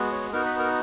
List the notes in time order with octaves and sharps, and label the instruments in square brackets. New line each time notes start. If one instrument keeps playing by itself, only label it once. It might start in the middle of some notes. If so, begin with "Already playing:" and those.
Already playing: [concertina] G#3 B3 F#4
C#5
B3 D#4 F#4 A#4
B4
A#4